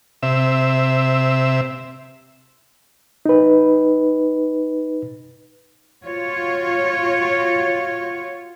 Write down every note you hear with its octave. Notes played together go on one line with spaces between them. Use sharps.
C3 E5
D#4 B4
F4 F#4 C#5